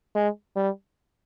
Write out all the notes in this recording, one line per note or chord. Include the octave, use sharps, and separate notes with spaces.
G#3
G3